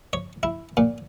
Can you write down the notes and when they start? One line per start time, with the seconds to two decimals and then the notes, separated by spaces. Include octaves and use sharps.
0.13 C#5
0.43 E4
0.77 A#2